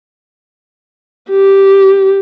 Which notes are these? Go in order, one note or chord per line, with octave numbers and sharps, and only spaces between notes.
G4